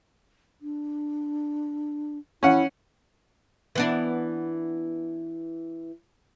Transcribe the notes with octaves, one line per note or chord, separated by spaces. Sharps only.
D4
C#4 E4 F#5
E3 B3 D4